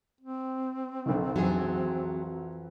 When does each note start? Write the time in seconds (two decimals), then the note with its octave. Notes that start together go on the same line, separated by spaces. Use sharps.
0.21 C4
1.06 B1 D3 D#3
1.36 F2 E3 F#3 G#4 A5